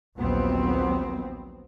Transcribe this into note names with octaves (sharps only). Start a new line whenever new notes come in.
A#1 D#2 F#3 B3 C4